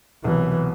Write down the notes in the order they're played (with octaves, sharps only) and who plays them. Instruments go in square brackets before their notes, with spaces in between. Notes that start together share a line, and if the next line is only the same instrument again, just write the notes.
[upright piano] C2 B2 F#3 [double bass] E3